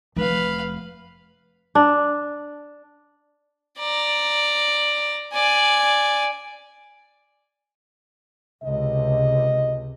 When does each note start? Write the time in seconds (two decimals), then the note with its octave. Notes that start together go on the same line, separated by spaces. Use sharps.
0.16 F1 B4 F5
1.75 D4
3.79 D5 A#5
5.34 D5 G#5
8.63 C#2 C3 D#5